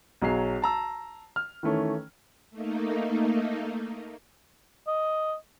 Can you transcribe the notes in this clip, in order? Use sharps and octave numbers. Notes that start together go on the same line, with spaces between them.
B1 F#3 G#4 C7
A5 A#5 E6
F6
D#3 E3 A3 C#4
A3 A#3 D#4
D#5